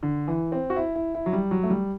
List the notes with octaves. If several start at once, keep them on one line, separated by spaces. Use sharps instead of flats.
D3
E3
C4
F#4
E4
E4
E4
F#3
G3
F#3
A3
G3